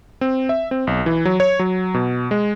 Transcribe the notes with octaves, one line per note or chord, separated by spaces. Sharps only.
C4
E5
C4
B1
E3
F#3
C#5
F#3
B2
G#3